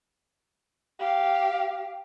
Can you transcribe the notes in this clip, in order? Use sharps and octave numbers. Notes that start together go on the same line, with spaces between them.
G4 F5